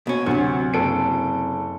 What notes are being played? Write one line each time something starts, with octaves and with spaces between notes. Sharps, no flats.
B2 C#4
D2 C3 F#3
F#1 A4 D7